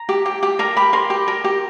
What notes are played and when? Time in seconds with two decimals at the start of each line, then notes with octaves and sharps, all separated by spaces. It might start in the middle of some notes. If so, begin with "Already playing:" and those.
Already playing: A#5
0.09 G4
0.26 G4
0.43 G4
0.59 A#4 A#5
0.77 G4 B5
0.93 A#4 C6
1.10 G4
1.28 A#4
1.44 G4